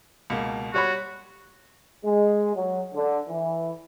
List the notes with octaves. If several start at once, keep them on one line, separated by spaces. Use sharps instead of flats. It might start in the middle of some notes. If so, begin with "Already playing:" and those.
C#2 B2 A#3
G3 F#4 C#5 B5
G#3
F#3
D3
E3